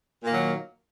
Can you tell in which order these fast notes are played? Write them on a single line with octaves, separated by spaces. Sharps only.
A#2 A#3 D#3 F#3